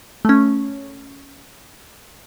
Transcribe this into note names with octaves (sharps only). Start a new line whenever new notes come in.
A3 C#4